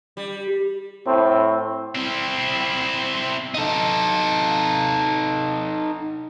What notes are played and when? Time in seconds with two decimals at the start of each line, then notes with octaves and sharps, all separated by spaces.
0.17 G3
1.07 A2 C4
1.95 C4 E4
3.54 D#4 A4